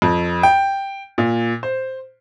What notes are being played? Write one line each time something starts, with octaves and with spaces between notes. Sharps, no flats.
F2
G5
A#2
C5